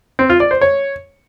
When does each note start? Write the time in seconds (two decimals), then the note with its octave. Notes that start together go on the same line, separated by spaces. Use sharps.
0.19 C4
0.30 F4
0.40 D5
0.51 C5
0.61 C#5